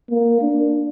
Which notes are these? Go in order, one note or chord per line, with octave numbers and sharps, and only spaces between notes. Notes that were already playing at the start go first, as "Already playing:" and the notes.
A#3
D4